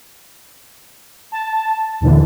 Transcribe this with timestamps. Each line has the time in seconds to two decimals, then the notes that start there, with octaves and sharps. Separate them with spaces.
1.32 A5
2.01 D#2 A#2 D3 E3